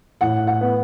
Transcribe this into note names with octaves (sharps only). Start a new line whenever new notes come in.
A2 F#5
F#5
B3